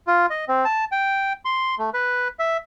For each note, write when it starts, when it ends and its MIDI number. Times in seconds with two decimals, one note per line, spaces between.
0.07 0.26 65
0.30 0.45 75
0.48 0.65 60
0.65 0.85 81
0.92 1.33 79
1.45 1.75 84
1.79 1.90 57
1.94 2.28 71
2.39 2.57 76